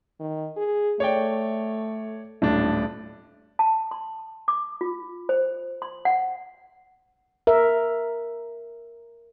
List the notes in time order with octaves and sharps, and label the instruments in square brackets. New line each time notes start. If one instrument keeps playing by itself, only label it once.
[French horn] D#3
G#4
[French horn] A3 [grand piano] C#5 D5 G5
[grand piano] D#1 A2 D4 [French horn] F#3
[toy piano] A5
C6
D6
F4
C5
C6
F#5
[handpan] A#4 E5